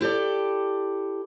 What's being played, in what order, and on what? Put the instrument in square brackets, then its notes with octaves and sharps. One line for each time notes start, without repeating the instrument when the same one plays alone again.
[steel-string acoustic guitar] E4 G4 A4 D5